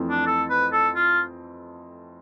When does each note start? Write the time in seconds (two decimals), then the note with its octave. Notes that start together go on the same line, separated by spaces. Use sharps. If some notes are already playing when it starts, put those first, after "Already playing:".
Already playing: F2 E3 A3 C4
0.10 D4
0.27 A4
0.50 B4
0.73 A4
0.96 F4